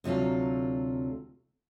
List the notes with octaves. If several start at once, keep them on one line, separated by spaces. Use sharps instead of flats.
D2 C3 F#3 F4 A4